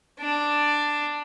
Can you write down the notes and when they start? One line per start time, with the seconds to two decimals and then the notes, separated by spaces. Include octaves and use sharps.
0.20 D4